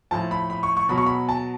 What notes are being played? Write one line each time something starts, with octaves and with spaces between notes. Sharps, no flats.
A2 F3 A5
B5
B5
C#6
C#6
B2 F#3 B5
C#6
B5
A5